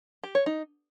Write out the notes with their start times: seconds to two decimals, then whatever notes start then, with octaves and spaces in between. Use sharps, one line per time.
0.23 G4
0.35 C#5
0.46 D#4